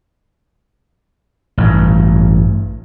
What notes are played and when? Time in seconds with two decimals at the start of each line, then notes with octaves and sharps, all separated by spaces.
1.58 A1 G2